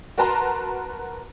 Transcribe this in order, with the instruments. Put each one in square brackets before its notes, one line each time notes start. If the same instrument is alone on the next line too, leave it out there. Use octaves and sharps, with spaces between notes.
[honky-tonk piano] F#4 A#4 B4 A5 A#5 C6